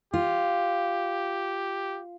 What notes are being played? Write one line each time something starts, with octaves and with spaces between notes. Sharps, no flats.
F4 G4